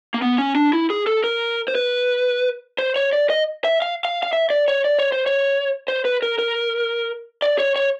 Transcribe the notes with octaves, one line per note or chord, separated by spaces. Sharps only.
A#3
B3
C#4
D4
E4
G#4
A4
A#4
C5
B4
C5
C#5
D5
D#5
E5
F5
F5
F5
E5
D5
C#5
D5
C#5
C5
C#5
C5
B4
A#4
A#4
D5
C#5
C#5